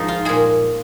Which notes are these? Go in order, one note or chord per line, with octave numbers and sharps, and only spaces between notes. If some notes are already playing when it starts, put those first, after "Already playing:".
Already playing: G#2 F3 D#4 G#4
F4
A#2 G#3 G#4